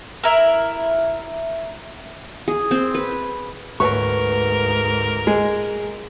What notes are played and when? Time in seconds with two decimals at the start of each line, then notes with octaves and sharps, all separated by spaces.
0.24 E4 A#4
2.48 G#4
2.71 C4
2.94 B4
3.80 D2 G#2 A#4 B4 C#5 C#6
5.27 G#3